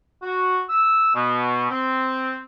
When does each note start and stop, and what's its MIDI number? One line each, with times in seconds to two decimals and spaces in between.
0.22 0.61 66
0.69 1.14 88
1.14 1.66 47
1.70 2.37 60